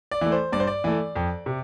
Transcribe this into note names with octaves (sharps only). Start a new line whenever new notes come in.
D5
E3 A3
C5
G2 D5
C5
D5
E3 A3
F2
C3